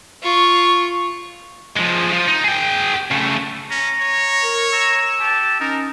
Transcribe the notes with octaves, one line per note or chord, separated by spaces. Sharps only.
F4 C#6
F3 G#3
F3
D#4
G#4 G5
C#3 A3
C#4 A#5
C#5
A#4
A#5 E6
G4 A5
C#4 D#4 A#4